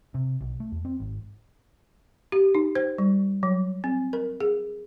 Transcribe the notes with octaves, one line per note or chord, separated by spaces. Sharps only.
C3
B1
A3
E2
C4
G#1
G4
D#4
C5
G3
F#3
C4
A#4
G#4